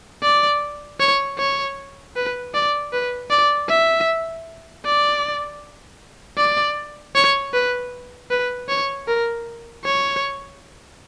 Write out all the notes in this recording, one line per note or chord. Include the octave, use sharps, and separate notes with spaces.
D5
C#5
C#5
B4
D5
B4
D5
E5
D5
D5
C#5
B4
B4
C#5
A#4
C#5